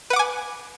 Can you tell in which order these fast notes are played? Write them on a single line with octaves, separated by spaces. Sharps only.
B4 F#5 D6 G#5